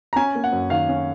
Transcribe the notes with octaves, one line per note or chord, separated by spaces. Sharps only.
A#5
C#4 G#5
A#3
F#5
F#2
D#3 F5
C#4